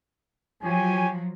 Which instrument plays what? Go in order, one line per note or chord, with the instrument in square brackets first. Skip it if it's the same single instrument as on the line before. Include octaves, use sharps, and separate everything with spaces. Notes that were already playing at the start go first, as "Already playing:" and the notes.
[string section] F3 F#3 [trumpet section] G4 C#5 G#5